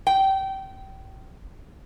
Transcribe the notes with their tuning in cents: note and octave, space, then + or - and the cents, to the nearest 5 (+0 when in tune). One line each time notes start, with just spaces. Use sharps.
G5 -25